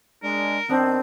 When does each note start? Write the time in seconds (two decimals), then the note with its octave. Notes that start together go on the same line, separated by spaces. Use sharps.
0.23 G#3 D4 A#4
0.69 D#3 B3 C4 D4